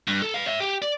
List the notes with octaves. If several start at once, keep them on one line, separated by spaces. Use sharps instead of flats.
G2
A4
B4 F5
C#5 E5
G4
D5